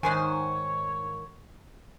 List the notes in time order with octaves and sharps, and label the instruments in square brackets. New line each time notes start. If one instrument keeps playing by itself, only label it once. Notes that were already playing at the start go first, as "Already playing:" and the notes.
[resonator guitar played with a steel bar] G#2 C5 G#5 [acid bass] D#3 [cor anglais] C#5